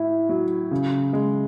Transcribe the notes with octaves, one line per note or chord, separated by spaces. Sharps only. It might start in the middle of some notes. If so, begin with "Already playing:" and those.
Already playing: A2 E4
F#3
C#3
G#3